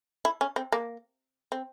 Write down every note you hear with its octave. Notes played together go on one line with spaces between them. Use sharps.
E4
C#4
C4
A#3
C4